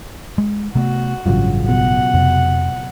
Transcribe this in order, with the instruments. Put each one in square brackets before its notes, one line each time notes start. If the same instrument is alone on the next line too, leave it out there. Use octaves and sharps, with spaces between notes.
[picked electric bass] G#3
[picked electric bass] C3 A3 B3 [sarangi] F#4
[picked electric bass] A1 G2 [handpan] C#3 F#3 F4
[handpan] B2 [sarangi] F#5
[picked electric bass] F2 C3